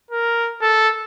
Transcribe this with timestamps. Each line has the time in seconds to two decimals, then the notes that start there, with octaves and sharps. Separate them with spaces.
0.11 A#4
0.62 A4